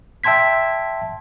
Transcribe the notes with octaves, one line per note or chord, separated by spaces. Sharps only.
E5 G5 A5 C6 G#6 B6